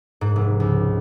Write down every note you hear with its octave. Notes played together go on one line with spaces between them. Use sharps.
G#2
F1
C#2